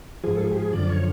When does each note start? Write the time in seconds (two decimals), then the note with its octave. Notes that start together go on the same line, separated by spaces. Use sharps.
0.24 G#2 F3 G#4
0.36 A4
0.40 G#4
0.51 G4
0.57 G#4
0.73 F#2 D3 F3 D5
0.89 C#5